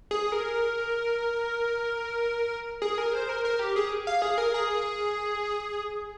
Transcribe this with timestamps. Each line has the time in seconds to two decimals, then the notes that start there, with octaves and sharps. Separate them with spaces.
0.11 G#4
0.32 A#4
2.82 G#4
2.98 A#4
3.13 C5
3.29 A#4
3.45 A#4
3.59 G4
3.76 G#4
4.07 F5
4.22 G#4
4.38 A#4
4.54 G#4